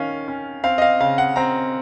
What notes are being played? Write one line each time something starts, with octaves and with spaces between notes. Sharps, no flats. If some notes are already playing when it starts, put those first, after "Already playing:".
Already playing: D#3 C#4 F5
C#4
C4 F5
D#5
F5
C#3 F5
F#5
C4 A#5